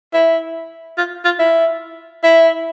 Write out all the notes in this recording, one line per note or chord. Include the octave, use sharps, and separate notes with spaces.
E4
F4
F4
E4
E4